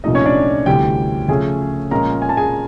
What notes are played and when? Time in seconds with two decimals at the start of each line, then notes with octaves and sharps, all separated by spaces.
0.04 C2 A#2 F3 A3 D#4 D#5
0.15 C#4 C#5
0.26 D4 D5
0.66 D2 C3 E3 G3 G4 G5
1.28 C#3 F3 A3 C#4 G#4 G#5
1.91 A#2 F3 G#3 C#4 A#4 A#5
2.22 G#5
2.29 A5
2.37 G#4 G#5